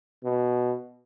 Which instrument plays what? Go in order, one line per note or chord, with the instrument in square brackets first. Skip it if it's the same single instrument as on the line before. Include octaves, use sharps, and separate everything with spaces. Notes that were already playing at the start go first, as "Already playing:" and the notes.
[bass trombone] B2